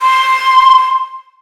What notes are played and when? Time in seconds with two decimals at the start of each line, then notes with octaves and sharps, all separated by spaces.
0.02 C6